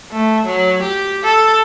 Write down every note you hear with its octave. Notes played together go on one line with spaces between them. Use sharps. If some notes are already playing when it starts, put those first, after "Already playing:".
A3
F#3
G4
A4